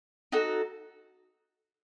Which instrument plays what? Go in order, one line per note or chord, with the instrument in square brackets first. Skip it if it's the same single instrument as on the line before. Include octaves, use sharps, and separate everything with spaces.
[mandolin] D#4 F#4 A4